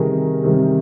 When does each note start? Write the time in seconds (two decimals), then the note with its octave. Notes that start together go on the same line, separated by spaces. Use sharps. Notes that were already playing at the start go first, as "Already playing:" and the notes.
Already playing: C3 D#3 G3 G#4 A#4
0.43 C3 D#3 G3